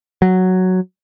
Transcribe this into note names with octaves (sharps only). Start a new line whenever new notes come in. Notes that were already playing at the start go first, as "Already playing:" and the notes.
F#3